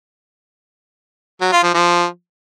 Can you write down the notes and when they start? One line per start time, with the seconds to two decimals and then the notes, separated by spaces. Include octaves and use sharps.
1.41 F#3
1.52 F4
1.63 F3
1.74 F3